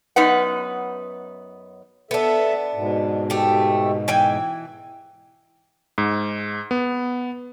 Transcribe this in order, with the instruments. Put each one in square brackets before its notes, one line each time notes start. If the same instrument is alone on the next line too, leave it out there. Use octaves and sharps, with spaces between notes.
[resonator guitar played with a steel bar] F#2 B3 D#4 B4 F#5
[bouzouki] B3 D4 [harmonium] A4 E5
[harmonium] G#2 B2
[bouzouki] A3 G4
E3 G5 G#5
[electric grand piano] G#2
B3